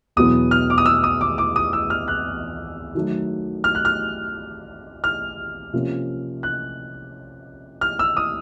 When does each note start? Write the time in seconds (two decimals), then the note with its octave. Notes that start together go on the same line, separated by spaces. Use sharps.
0.16 E2 B2 F#3 B3 E4 D#6
0.51 F6
0.70 D6
0.78 D#6
0.86 E6
1.04 D#6
1.21 D6
1.38 D6
1.56 D#6
1.73 E6
1.90 F6
2.08 F#6
2.95 D#3 F#3 A3
3.64 F6
3.75 F#6
3.85 F6
5.04 F6
5.73 C3 F3 A#3 C#4
6.43 F#6
7.81 F6
7.99 E6
8.17 D#6